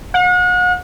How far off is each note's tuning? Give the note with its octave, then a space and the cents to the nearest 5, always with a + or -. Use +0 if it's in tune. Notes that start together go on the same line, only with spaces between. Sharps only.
F#5 -40